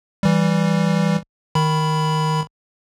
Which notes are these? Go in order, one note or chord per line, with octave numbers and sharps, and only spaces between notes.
E3 G3
D#3 B5